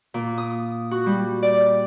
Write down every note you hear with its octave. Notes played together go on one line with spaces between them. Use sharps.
A#2
D#6
F#4
G3
D5